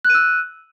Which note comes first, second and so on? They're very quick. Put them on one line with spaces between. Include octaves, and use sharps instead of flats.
F#6 D#7 E6